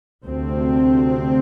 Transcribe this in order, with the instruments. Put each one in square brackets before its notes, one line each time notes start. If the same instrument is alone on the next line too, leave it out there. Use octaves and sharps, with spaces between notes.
[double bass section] D2 C3 C4